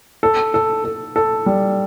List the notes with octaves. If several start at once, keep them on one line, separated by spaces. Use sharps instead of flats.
A4
A4
A4
A4
G3